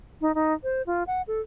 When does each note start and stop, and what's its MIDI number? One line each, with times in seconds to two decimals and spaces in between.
0.21 0.34 63
0.35 0.53 63
0.63 0.82 72
0.86 1.03 65
1.07 1.22 78
1.27 1.41 69